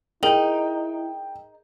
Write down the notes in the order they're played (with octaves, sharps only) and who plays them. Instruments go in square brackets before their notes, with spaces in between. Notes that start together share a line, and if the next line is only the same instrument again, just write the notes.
[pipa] D#4 [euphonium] E4 [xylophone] G#4 A#4 [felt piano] G5